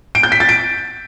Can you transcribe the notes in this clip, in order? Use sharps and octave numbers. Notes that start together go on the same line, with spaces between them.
D7
G6
B6
A6
D7